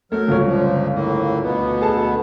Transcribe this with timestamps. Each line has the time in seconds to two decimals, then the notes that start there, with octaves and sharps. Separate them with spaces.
0.12 F#3 A3 A#4
0.28 G1 C#2 C#5
0.47 F3
0.94 A2 A#3
1.43 D2 B2 B3
1.81 G#4 A4 A5